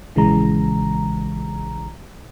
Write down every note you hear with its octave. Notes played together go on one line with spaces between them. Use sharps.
A#1 C#3 E3 G#3 A#5